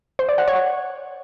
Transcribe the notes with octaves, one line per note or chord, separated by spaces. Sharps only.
C5
D5
F#5
C#5